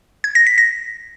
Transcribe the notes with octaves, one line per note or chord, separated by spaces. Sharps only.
G#6
A#6
B6
A#6